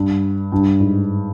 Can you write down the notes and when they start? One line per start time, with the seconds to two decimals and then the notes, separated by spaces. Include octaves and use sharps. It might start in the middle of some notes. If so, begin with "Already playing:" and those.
Already playing: G2
0.52 G2
0.80 G#2